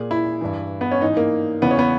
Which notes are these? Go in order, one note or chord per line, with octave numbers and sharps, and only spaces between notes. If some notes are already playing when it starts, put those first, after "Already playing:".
Already playing: A#2 G#4
E4
G2 E3
B3
C#4
G#2 E3 D#4
A#3
E2 C#3 E3 B3
C#4
B3